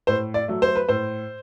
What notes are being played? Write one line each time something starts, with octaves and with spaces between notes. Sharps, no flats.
A2 C5
D5
F#3 A3
C5
B4
A2 C5